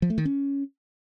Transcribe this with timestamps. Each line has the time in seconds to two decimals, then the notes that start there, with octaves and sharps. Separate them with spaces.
0.02 F3
0.10 A3
0.18 D#3
0.25 C#4